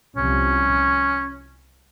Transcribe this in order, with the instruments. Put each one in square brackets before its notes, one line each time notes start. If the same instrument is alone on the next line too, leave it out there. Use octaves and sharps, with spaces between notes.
[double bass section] C2 C3 F3 [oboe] C#4